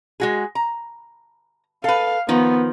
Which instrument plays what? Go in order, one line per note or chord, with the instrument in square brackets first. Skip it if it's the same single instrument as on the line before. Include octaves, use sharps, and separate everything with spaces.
[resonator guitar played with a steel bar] G#3 F#4 G#4
A#5
[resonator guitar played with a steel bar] A4 B4 [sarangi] F5
[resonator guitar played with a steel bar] D#3 F3 [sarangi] B3